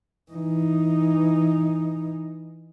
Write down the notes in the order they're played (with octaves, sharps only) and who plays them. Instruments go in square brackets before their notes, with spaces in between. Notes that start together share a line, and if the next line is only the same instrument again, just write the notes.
[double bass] E3 D#4